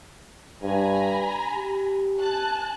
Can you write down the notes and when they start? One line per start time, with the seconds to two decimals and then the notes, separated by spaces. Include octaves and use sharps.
0.63 G2 G#5 A#5 B5
1.56 G4
2.19 G#5 A5 F#6